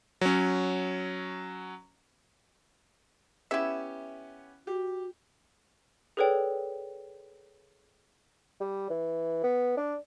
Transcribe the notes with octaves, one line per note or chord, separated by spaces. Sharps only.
F#3 C#4
B3 C#4 E4 G4 E5
F#4 G4
G#4 A4 B4 C#5 D5 G5
G3
E3
B3
D4